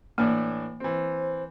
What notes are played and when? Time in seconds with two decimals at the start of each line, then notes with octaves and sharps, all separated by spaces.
0.18 A2 E3 A#3 D4
0.80 E3 C4 C5